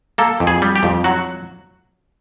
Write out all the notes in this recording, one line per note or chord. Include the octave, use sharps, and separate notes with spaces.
A#3 A4
F2
G#4
G3
G4
F2
F#3 F#4